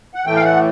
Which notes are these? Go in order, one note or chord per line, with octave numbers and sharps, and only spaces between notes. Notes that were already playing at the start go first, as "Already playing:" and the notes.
F#5
A2 E3 A3 G5
F5
F#5